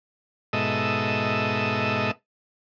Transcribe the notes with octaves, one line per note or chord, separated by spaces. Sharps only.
G#2 B2 A4 D#5 E5